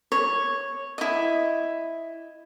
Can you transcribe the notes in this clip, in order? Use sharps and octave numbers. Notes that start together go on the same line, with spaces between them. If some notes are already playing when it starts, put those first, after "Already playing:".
C#5
E4 D#5